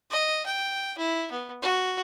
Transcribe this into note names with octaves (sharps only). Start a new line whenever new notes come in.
D#5
G5
E4
B3
F#4